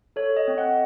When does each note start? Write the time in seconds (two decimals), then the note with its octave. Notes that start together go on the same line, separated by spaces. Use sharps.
0.16 A4 C#5
0.37 D#5
0.48 C4
0.58 F#5